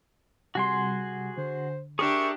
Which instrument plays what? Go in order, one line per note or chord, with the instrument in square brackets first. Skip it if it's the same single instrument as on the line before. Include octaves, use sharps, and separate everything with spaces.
[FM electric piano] C3 G3 F#5 [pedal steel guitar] F#4 G#4 C6
[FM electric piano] D3 [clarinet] C5
[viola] D4 G4 [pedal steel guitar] G#4 A#4 E5 [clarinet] C#6